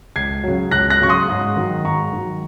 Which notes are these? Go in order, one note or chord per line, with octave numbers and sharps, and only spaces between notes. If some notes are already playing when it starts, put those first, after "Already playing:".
C#2 G#6 C7
C#3 F#3
C#2 F#6 A#6
F#6 A#6
C#3 F#3 C#6
C6 D#6
G#2
D#3 F#3
G#2 A#5 C#6
D#3 F#3